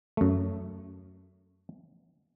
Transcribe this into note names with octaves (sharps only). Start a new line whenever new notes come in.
F#2 A3